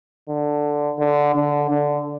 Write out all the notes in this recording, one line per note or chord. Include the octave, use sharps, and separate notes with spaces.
D3
D3
D3
D3